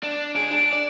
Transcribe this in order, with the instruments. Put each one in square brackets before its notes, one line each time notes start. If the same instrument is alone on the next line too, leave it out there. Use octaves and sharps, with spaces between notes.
[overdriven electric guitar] D4
[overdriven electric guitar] C#2 G#4 [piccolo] D7
[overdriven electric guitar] D4
D5